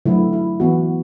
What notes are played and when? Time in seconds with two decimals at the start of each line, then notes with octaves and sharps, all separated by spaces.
0.06 D3 F#3 A3 E4
0.33 E4
0.60 E3 B3 F#4